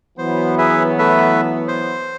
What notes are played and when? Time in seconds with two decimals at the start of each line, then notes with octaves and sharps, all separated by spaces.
0.18 E3 F#3 B3 C5
0.58 G#4 B4 E5
0.99 A3 B4 E5
1.68 C5